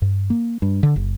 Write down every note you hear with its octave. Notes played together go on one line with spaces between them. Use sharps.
G2
A#3
G2
D3
F#1